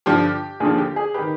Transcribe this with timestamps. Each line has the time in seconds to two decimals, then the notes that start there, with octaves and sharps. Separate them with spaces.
0.06 G2 D3 F3 G4
0.60 D#2 D3 F3 G#4
0.78 G4
0.96 G#4
1.14 D#3 G4 B4